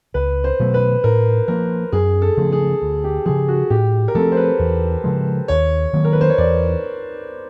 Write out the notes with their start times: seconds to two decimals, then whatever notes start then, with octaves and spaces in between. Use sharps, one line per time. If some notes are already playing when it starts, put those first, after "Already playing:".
0.14 C#2 B4
0.44 C5
0.60 B2 F#3 A3
0.74 B4
1.04 A2 A#4
1.48 F3 A#3 A#4
1.92 F#2 G#4
2.22 A4
2.37 C#3 F3 A3
2.52 G#4
2.82 D2
3.04 G4
3.26 C#3 F3 G#4
3.48 F#4
3.70 A2 G4
4.08 A#4
4.15 F3 A3 C4 A4
4.32 C5
4.37 B4
4.59 E2
5.04 C#3 F3 G#3
5.48 D#2 C#5
5.93 D#3 F#3 A#3
6.05 A#4
6.13 B4
6.21 C5
6.30 C#5
6.38 E2 D5